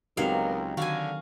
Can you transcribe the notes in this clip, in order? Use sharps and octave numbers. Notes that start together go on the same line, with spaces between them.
C#2 F#3 B3 C4 D#4 G4 A#4 F5
D3 D#3 F#4 F5 G#5